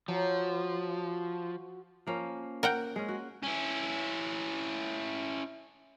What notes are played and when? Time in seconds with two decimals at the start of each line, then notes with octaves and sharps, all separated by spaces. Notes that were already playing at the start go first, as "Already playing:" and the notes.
0.08 F3 F#3
2.07 F3 A#3 C#4
2.63 A#4 F#5 G5
2.96 G#3 C#4
3.08 F#4
3.43 C#4 E4